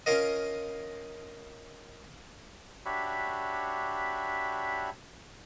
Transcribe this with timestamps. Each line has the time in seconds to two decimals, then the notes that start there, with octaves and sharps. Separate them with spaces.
0.06 C#4 F4 A#4 D#5
2.86 D4 F#4 G4 C#5 E5 B5